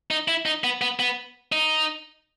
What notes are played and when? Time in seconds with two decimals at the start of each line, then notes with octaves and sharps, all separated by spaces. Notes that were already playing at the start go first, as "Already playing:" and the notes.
0.11 D#4
0.28 E4
0.46 D#4
0.64 B3
0.81 B3
0.99 B3
1.52 D#4